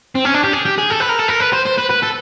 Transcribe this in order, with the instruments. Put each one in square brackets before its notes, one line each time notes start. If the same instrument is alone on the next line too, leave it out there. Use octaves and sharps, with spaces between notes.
[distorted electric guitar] C4
C#4
D4
G4
G#4
G4
G#4
A4
B4
A#4
A4
A#4
B4
C5
C5
B4
B4
A4